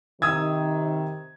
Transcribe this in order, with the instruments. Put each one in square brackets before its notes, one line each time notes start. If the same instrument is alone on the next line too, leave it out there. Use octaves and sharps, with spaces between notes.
[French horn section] C3 D#3 [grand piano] D#6 E6 G#6